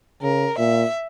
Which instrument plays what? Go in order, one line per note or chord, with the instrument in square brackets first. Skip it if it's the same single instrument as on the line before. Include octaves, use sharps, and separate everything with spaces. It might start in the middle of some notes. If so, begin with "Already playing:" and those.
[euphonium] C#3 [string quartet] A#4
[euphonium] A#2 [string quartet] E5